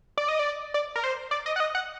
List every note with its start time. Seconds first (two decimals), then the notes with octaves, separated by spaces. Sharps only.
0.17 D5
0.29 D#5
0.39 D5
0.74 D5
0.96 A#4
1.04 C5
1.31 D5
1.46 D#5
1.56 F#5
1.60 D#5
1.75 F#5